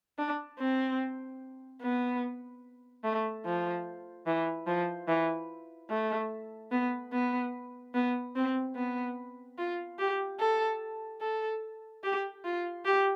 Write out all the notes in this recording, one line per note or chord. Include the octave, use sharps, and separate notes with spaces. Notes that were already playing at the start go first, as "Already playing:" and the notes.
D4
C4
B3
A3
F3
E3
F3
E3
A3
B3
B3
B3
C4
B3
F4
G4
A4
A4
G4
F4
G4